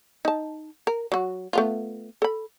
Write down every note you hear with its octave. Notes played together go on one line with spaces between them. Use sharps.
D#4 A5
A#4
F#3 F#4
A3 B3 F4
A4 B5